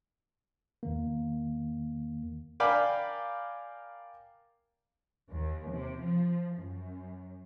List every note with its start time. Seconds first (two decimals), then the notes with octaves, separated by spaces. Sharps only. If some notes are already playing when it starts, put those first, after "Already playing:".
0.83 E2 D#3 A#3
2.60 A#4 D5 F5 G5 G#5 B5
5.31 D#2
5.72 C3
6.02 F3
6.58 F#2